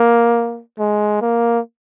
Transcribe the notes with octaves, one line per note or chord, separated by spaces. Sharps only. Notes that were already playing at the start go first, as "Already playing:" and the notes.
Already playing: A#3
G#3
A#3